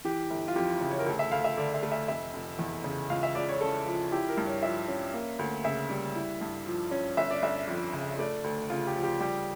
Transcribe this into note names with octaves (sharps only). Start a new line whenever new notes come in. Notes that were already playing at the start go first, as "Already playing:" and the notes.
E3 G4
G1
F4
F2 G4
C#3
C#5
A#4
D2 A4
E5
D2 F5
E5
D3 D5
E5
A3
E5
F1 E5
F1
E2
C#3
C#2 F5
E5
C#2 D5
C#5
C#3 A4
F3
E4 G4
A#4
G2
C#5
F3 E5
C#4
A#3
D2
C#3 E5
G3
E4
G2
F3
C#4
G1 E5
D5
G1 E5
F2
C#3
A3 D5
D2
C#3 F4
G4
F3
G4
G3 G4